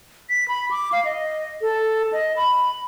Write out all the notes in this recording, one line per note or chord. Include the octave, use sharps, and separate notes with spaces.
B6
B5
D6
F5
D#5
A4
D#5
B5